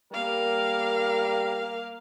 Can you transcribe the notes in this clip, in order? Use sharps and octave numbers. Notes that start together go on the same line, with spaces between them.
G3 A#3 A#4 F5